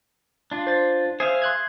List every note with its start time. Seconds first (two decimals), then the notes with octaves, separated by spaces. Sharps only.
0.52 D4 F4
0.67 C5 A6
1.20 G#4 C5 E5 F5
1.42 C6 F#6 G#6